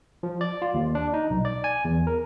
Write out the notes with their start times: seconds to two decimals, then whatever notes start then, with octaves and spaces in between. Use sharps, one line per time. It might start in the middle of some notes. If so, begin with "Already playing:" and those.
0.23 F3
0.41 D5
0.62 F4
0.74 D#2
0.95 D4
1.14 D#4
1.30 B1
1.45 D5
1.64 G#5
1.85 E2
2.07 A#4